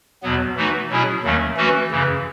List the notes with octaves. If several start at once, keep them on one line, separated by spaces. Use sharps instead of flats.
E2 B2 F#3 B3
E3 A3 D#4 F#4 B4
B2 F#3 C#4 E4 G#4
D#2 D#3 F#3 A3 C#4
E3 A3 C#4 F#4 B4
F#2 C#3 E3